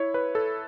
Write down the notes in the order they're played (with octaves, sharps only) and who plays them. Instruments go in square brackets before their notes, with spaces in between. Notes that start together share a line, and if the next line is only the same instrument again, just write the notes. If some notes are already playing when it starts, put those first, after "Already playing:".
Already playing: [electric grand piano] E4 C#5
B4
A4